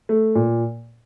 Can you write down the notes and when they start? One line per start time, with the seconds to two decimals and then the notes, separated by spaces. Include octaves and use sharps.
0.09 A3
0.35 A#2